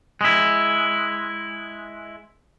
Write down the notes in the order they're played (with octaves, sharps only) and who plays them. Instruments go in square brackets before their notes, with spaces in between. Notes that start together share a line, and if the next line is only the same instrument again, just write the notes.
[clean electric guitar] G#3 E4